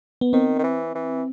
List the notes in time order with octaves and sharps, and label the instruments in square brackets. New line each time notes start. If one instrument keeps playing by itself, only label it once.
[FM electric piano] B3
[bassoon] D#3 [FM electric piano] C4
[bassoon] D#3
E3
E3